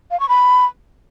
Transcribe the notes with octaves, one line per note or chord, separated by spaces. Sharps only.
F5
C#6
B5